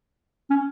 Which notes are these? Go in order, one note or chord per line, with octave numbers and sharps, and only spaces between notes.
C#4